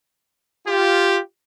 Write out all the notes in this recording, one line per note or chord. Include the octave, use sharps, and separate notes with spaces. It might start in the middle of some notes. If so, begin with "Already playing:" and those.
F4 G4